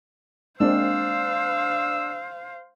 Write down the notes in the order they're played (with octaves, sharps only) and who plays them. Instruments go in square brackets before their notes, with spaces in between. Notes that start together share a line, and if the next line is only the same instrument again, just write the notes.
[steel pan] G#3 A#3 C4 [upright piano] D4 [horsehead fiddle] C5 F5 [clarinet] E6